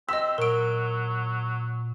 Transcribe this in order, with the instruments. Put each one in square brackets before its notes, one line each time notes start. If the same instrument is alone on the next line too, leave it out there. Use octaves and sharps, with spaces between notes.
[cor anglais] C4 [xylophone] D#5 B6 [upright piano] E6
[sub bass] A#2 [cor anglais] F#3 [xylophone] A#4 D7